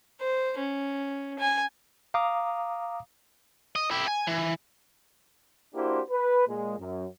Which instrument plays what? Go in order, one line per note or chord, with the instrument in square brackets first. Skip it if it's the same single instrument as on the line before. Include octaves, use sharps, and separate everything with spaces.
[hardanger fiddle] C5
C#4
G#5
[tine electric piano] F5 A#5 D6 D#6
[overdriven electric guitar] D#5
E4 G4
G#5
E3
[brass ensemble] A#3 D4 E4 F#4 G4 C5
B4
A#2 G#3
F#2